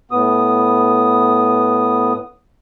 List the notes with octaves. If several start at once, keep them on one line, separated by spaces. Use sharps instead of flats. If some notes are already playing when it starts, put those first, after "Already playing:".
A2 B3 D#6